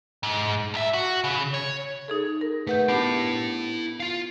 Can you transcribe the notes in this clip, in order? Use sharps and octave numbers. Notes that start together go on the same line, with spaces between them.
G#2
B1 E5
F#4
C#3
C#5
D#4 G#4 A4
A#4
A3 B4 F#5 G6
B3 D4 E4 G4 A5
F4 F5